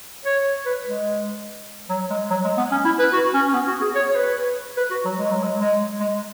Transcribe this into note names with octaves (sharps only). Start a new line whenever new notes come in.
C#5
B4
G#3
F#3
G#3
F#3
G#3
B3
C#4
E4
B4
F#4
C#4
C#4
B3
F#4
G#4
C#5
C#5
B4
B4
F#4
F#3
G#3
F#3
G#3
G#3
G#3